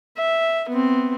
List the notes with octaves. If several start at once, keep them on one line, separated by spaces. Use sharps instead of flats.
E5
B3 C4